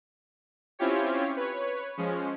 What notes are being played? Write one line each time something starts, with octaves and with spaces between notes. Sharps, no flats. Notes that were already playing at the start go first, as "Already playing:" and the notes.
C4 C#4 E4 F4 G4 C#5
B4 C#5
F3 G#3 C#4